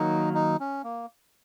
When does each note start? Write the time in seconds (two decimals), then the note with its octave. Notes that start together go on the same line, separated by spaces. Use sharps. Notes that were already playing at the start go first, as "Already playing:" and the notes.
Already playing: D#3 F#3 A#3 D#4
0.35 D#4
0.60 C#4
0.84 A#3